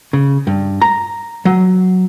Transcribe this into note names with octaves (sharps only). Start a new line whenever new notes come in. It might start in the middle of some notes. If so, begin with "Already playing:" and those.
C#3
G2
A#5
F#3